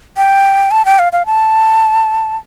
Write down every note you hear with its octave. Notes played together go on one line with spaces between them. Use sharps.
G5
A5
G5
F5
F5
A5